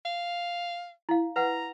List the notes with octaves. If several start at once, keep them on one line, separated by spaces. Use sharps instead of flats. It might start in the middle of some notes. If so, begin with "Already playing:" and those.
F5
E4 F5
B4 F#5 A#5